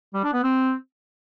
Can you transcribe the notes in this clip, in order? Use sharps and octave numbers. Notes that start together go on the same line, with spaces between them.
G3
D4
B3
C4